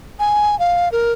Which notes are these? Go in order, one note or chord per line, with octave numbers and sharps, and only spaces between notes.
G#5
F5
A#4